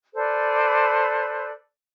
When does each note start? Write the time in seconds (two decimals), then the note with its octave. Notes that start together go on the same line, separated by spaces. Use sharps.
0.14 A4 B4 C5 D5